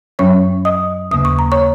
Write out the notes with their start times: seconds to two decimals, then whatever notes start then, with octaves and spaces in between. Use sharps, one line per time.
0.19 F#2 F#3 C#4 C#5 C#6
0.65 D#5 D#6
1.11 D#2 C#3 A#3 D#6
1.25 C#6
1.39 A#5
1.52 C#5 C#6